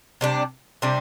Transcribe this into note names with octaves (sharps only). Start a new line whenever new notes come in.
C3 G3 D4
C3 G3 D4